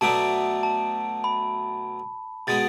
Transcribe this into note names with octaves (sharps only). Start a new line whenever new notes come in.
B2 F#3 A3 D4 A5
A5
B5
B2 G#3 B3 A6